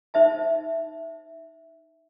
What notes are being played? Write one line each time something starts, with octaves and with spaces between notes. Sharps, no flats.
D#4 C5 E5 A5